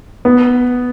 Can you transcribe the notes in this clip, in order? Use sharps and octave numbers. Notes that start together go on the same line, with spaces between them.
B3